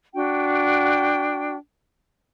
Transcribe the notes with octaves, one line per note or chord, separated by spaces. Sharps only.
D4 F#4 G5